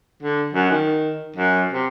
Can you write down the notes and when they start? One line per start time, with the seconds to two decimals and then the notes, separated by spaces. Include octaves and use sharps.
0.22 D3
0.53 F#2
0.71 D#3
1.36 F#2
1.72 C3